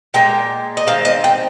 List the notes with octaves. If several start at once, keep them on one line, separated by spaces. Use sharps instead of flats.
A#2 G#3 G5
D#5
D#3 G#3 C4 F5
D#5
G5